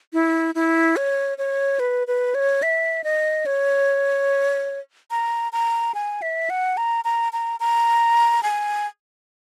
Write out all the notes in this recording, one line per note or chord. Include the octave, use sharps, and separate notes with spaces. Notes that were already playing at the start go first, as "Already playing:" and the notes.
E4
E4
C#5
C#5
B4
B4
C#5
E5
D#5
C#5
A#5
A#5
G#5
E5
F#5
A#5
A#5
A#5
A#5
G#5